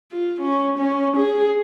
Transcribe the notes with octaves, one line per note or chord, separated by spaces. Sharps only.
F4
C#4
C#4
G#4